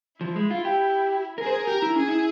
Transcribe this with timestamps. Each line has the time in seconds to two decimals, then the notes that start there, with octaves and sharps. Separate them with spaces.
0.21 F3 E4
0.36 G#3
0.51 F4
0.65 G4
1.38 G#4 A#4
1.46 C5
1.52 A#4
1.67 G4 A#4
1.82 E4
1.96 C#4 G#4
2.08 E4